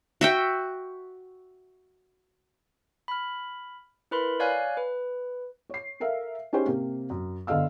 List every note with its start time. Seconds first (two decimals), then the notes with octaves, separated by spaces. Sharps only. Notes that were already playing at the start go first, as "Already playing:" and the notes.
0.21 F#4 E5 G5
3.08 B5 F6
4.11 E4 A#4 B4 B5 C6
4.40 C#5 D5 F5 G#5 F#6
4.77 B4
5.69 C#5 C7
6.00 A4 A#4 E5 F5
6.53 C#4 D#4 G4 G#4 C5 C#5
6.66 C3 A#3 C4
7.10 F#2
7.47 G1 D3 A4 D#5 F5 E6